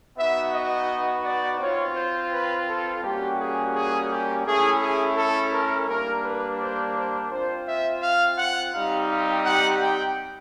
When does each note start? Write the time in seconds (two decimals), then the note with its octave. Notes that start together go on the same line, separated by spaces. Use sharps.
0.18 B3 D#4 F#4 E5
0.53 D#5
1.25 D5
1.60 C4 F4 C#5
1.96 C5
2.31 B4
2.67 A4
3.03 G3 A#3 C#4 F#4 G4
3.39 G#4
3.74 G#4
4.10 G4
4.45 A3 C#4 E4 G#4
4.81 G#4
5.17 A4
5.52 A#4
5.87 G3 A#3 D4 A#4
6.23 B4
6.59 C5
6.95 C5
7.31 C4 F4 C5
7.67 E5
8.02 F5
8.37 F#5
8.73 G3 C4 D#4 G4 F5
9.08 F5
9.44 F#5
9.79 G5